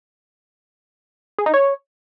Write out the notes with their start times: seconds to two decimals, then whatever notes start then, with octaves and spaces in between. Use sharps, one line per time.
1.39 G#4
1.46 D#4
1.54 C#5